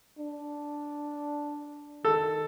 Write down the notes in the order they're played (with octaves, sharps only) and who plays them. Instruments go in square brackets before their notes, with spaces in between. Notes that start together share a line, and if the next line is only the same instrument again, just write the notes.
[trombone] D4
[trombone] D#3 [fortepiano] A4